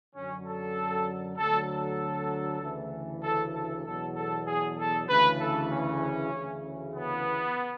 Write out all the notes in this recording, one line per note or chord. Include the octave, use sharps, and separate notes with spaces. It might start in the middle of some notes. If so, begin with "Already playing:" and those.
F#2 D3 F#3 C#4
A4
D2 D3 F#3 A4
A4
D2 C#3 E3
A4
A4
E2 B2 F#3 A4
A4
G#4
A4
D2 C#3 E3 B4
A4
C#4
D2 C#3 E3
B3